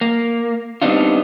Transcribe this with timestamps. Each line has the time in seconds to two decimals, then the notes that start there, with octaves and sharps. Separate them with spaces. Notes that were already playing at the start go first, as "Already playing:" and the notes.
0.01 A#3
0.82 G3 B3 C4 D4 D#4 F4